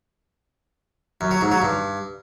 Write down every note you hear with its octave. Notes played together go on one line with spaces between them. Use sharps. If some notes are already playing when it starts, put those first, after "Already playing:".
F#2
F#3
G#2
F#3
G2